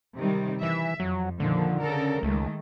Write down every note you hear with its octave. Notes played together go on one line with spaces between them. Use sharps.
C3 D#3 G3
E3 E5
F2 F#3
A#2 D3 D#3 F3
C#3 A4 A#4
C#2 D#3 G#3 A3